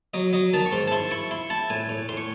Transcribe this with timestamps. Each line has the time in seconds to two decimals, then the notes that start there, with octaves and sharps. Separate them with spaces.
0.14 F#3 D#5
0.33 F#3 D#5
0.53 D#3 A5
0.66 C#6
0.72 G#2 C6
0.88 A5
0.92 E4 C6
1.11 E4 C#6
1.31 E4 C6
1.50 E4 A5
1.70 A2 G#5
1.89 A2
2.09 A2 C6
2.17 C#6